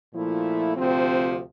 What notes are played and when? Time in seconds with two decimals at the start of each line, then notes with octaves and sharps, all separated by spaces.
0.15 A#2 F3 A3 E4
0.76 D2 C3 F3 C4